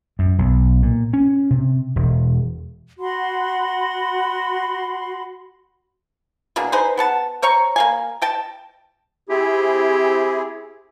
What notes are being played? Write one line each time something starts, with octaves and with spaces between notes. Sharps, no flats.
F#2
B1
A#2
C#4
C3
E1
F#4 F#5 B5 C6
B2 A#3 D4 G#4
D#4 G#4 B4 C5
B3 F#5 A5
C5 C#5 A#5 C#6
A#3 F5 G#5
D#5 G5 A5
C4 E4 G4 G#4